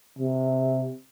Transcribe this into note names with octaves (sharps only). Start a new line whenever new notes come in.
C3